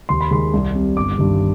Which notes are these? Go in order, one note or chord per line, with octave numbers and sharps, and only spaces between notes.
D#2 C6
B5
D#3 G#3 C6
C2
C3 G3
G1 D6
G2 D#3 G3